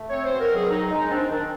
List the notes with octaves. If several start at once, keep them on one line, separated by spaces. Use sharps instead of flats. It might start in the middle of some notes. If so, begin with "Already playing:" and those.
Already playing: A3
C4 C#5
B2 C5
A#4
F#3
G#4
D#3 D#4
G#3 D#4
C4 D4
D#3 D4